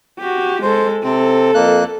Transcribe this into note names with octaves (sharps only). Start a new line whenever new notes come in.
F#4 G4
G#3 A4 C5
C3 C4 A4
F2 A#3 F#6